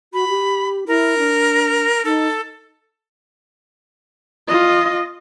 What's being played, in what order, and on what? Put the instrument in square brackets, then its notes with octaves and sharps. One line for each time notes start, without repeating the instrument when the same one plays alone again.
[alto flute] F#4 [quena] B5
[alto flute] G4
[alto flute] E4 [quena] A#4
[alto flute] D4
[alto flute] D#4 [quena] A4
[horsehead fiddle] F4 D#5